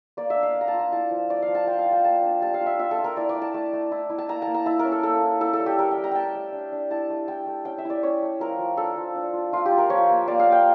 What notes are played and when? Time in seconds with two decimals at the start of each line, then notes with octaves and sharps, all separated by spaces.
0.17 A#3 D5
0.30 E5
0.36 D4
0.43 F5
0.55 A#3
0.61 A#5
0.68 A5
0.73 F4
0.80 A#5
0.92 E4 A5
1.11 F3
1.30 A3 D5
1.42 F5
1.48 F3
1.55 A5
1.67 F4 G5
1.79 F5
1.86 F4
1.92 G5
2.04 A#3 A5
2.22 D4
2.42 G3 A5
2.54 F5
2.61 F4
2.66 E5
2.79 F4 E5
2.91 A4
2.99 F4
3.04 A#4
3.17 E4 D5
3.29 D5
3.35 A3
3.42 A5
3.54 A3
3.73 A3
3.92 E4
4.10 E4
4.18 A5
4.29 A#3 A#5
4.42 A5
4.47 A#3
4.54 A#5
4.66 E4 A5
4.79 A#4
4.85 C#4
4.92 A4
5.03 A#3 A4
5.22 E4
5.41 E4 A4
5.53 A4
5.60 G3
5.66 G4
5.79 G3 A#4
5.91 G5
5.97 G3
6.04 A#5
6.11 A3 G5 A5
6.35 A3
6.53 D4
6.72 D4
6.91 E4 A5
7.10 A3
7.28 E4 G5
7.47 A3
7.65 C#4 G5
7.78 E5
7.85 E4
7.90 D5
8.03 C#4 C#5
8.22 A3
8.40 F3 A#4
8.59 F3
8.77 D4 A4
8.97 F3
9.15 D4
9.33 F4
9.52 A3 F4
9.66 G4
9.72 F4
9.78 A#4
9.90 F3 C#5
10.09 A#3
10.28 A#3 D5
10.40 F5
10.47 A#3
10.52 G5